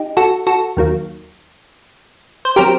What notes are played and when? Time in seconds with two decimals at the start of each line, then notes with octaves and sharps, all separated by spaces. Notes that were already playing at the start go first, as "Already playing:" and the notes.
Already playing: D#4 G4
0.17 F#4 A4
0.47 F#4 A4
0.77 D#2 D#3 F#3 A#3
2.45 C5
2.56 F#3 C4 G4 A#4